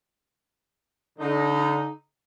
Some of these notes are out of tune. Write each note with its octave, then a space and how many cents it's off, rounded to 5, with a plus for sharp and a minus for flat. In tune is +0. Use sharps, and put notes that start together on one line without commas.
D3 -30 D#4 +0